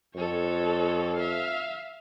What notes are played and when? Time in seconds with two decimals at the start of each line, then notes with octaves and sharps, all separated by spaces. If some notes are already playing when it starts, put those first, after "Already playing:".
0.15 F2 A4 C#5
1.15 E5 F5